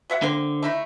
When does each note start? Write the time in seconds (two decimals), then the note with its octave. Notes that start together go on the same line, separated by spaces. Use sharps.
0.10 F#3 E5 F#5
0.22 D3 A#3 C4
0.63 A3 D#4 E4